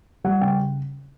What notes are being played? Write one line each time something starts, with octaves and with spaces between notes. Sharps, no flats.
G3 F#5
C#3 G5